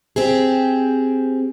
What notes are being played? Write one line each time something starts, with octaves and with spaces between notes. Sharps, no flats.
C4 G4 G#4